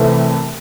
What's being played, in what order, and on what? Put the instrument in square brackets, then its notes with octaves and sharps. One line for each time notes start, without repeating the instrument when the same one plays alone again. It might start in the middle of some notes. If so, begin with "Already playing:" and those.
Already playing: [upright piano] C2 C3 E3 A3 C4